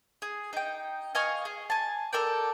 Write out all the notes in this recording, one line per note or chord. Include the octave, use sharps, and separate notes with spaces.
G#4
D#4 G5
D#5 F5 G#5 C#6
G#4
G#5 A5
A4 A#4 D5 G5